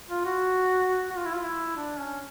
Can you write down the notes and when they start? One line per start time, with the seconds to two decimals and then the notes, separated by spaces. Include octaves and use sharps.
0.09 F4
0.26 F#4
1.10 F#4
1.17 F4
1.25 E4
1.33 F4
1.43 E4
1.76 D4
1.99 C#4